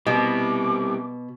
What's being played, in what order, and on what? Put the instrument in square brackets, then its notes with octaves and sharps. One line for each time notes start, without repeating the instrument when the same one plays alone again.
[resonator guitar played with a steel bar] B2 [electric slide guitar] G3 C4 [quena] D6